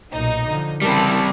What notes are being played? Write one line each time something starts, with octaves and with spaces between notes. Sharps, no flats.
B1 A#2 D#4
D3 F3
C#3 E3 G3 C4 A#4 A5 B5